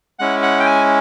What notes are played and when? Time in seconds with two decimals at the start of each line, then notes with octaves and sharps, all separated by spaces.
0.19 G#3 C#4 E4 F#5
0.43 F#5
0.60 G5
0.66 G#5